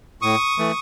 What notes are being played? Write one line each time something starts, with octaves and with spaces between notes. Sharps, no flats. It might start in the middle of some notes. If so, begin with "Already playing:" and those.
A2 C#6 D#6
E3 A3